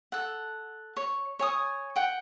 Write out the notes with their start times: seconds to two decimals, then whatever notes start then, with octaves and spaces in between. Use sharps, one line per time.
0.12 A4 F#5
0.97 C#5
1.39 C#5 G#5 D#6
1.96 F#5 G5